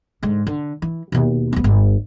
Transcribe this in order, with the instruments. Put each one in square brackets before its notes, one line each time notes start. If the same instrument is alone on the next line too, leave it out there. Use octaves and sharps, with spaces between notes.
[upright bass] G#2 D3
D3
E3
D#2 B2
D1 B3
G1